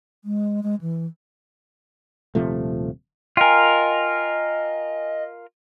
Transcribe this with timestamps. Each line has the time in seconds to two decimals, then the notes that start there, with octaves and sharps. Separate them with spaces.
0.25 G#3
0.63 G#3
0.81 E3
2.35 D#1 C3 F3 A3
3.37 F4 A#4 D#5 G5 G#5